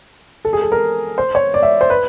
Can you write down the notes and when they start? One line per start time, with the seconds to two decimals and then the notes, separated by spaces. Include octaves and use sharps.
0.45 A4
0.53 G#4
0.62 A4
0.72 A#4
1.18 C5
1.35 C#5
1.54 D5
1.63 E5
1.81 C5
1.90 B4